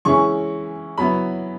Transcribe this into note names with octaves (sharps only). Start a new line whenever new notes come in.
E3 G#3 C#4 E4 C#6
F#3 B3 E4 B5